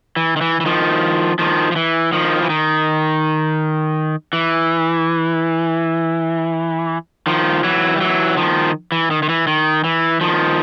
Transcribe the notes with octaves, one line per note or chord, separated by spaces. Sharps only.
E3
D#3
E3
E3
D#3 F3
D#3 F3
F3
E3
D#3 F3
E3
D#3
E3
D#3 F3
E3 F#3
G3
E3 F#3
D#3 F3
E3
D#3
D#3
E3
D#3
E3
D#3 F3